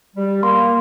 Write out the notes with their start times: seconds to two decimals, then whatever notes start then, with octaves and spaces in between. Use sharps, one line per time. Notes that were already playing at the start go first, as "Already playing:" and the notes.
0.16 G3
0.43 A#3 C6